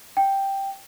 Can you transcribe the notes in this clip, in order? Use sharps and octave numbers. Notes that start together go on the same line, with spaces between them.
G5